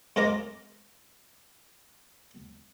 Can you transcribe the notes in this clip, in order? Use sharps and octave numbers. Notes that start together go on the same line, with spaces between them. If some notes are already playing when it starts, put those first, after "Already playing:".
G#2 C#4 F4 A#4 D#5 D6